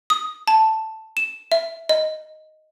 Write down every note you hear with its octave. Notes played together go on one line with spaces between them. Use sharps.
D#6
A5
E7
E5
D#5